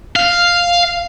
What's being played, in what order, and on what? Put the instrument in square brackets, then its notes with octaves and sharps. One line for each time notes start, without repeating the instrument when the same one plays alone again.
[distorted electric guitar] F5